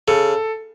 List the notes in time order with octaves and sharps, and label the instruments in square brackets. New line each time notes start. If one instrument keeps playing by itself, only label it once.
[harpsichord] C#3 [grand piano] A4